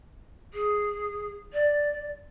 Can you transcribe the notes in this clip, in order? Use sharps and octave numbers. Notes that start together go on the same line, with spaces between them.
G#4
D5